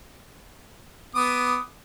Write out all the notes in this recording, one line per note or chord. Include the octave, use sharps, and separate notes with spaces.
B3 D6 D#6